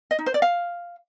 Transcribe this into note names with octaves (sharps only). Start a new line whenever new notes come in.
D#5
D#4
C5
D5
F5